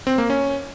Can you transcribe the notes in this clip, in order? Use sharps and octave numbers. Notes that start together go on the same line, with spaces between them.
C4
A#3
C#4